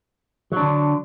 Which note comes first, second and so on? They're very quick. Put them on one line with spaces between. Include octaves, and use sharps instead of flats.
F#3 D4 D3